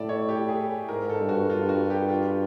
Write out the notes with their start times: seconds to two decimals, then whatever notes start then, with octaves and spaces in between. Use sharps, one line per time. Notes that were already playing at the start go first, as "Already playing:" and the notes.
Already playing: A2 D5 E5
0.09 C#5
0.29 G4
0.49 G#4
0.88 G#2 A#4
1.10 A4
1.20 G2
1.29 F#4
1.50 G2 F4
1.69 F#4
1.90 G4
2.09 F4